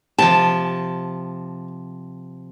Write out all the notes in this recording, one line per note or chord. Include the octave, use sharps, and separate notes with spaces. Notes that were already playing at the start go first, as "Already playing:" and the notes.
C3 F3 A5